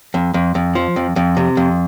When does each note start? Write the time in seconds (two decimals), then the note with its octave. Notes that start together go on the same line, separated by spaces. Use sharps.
0.14 F2
0.34 F2
0.55 F2
0.75 F3
0.96 F2
1.16 F2
1.37 C3
1.57 F2